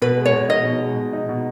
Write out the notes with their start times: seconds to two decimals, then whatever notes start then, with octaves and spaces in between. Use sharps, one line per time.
0.02 B2 B4
0.17 G#3
0.25 C#5
0.33 B2
0.49 D#4 D#5
0.65 B2
0.81 G#3
0.97 B2
1.13 D#4
1.29 B2